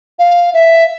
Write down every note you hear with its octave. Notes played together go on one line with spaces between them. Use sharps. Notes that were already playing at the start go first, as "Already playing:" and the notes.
F5
E5